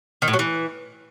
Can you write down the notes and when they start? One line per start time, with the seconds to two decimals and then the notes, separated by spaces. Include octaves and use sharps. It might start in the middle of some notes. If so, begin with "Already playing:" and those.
0.22 D#3
0.28 A2
0.33 F#3
0.39 E3